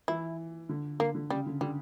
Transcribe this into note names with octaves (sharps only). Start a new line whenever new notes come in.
E3 E4
D3
D3 A#3
D3
C#3 G3
D3
D3 G3